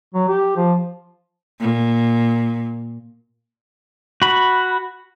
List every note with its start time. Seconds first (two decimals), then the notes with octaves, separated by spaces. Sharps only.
0.14 F#3
0.28 G4
0.57 F3
1.60 A#2
4.22 F#4 B5